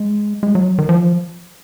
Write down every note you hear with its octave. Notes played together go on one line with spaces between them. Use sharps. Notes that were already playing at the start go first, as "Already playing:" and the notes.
Already playing: G#3
G#3
F#3
D#3
F3